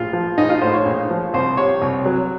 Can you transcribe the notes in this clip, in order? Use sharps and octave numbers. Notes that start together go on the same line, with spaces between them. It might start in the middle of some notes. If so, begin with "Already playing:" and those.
Already playing: A#1 A2 F4
F3
A#1 D#4
F4
A2 C5
C#5
A#1
F3
C2 C5
C3 C#5
C2
F#3